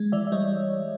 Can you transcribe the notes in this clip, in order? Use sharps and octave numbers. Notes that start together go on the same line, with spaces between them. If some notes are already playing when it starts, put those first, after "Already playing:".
Already playing: G#3
E3 D5 E5
E5
G3 C#5 D#5